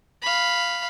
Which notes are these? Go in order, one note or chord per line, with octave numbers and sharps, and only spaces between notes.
F5 B5